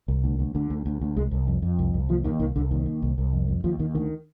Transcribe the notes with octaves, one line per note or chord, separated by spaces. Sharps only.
C2
D2
D2
D2 D3
D2
D2
D2
C2 G#3
C2
F2
F2
C2
C2
D#2 F3
D#2 D#3
C2 D#3
C2 D3
D#2 D#3
D#2
C2
C2
F2
F2
D#2 F3
D#2 D#3
D2 D#3